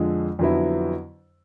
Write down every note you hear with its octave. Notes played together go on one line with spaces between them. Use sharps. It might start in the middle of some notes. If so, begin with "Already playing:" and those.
Already playing: F2 D3 F3 G#3
F2 D3 F#3 B3 E4